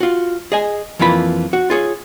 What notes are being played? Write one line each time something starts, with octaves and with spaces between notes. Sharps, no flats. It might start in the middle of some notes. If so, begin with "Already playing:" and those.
F4 F#4
G#4 D#5 G#5
F2 E3 A#3 F4 B5
F#4
F4 G#4 C#5